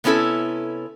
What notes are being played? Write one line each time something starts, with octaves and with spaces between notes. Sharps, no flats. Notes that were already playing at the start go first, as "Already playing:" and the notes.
C3 B3 C#4 E4 A4